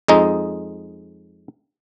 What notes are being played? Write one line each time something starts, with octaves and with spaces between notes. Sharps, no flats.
F2 G#3 D#4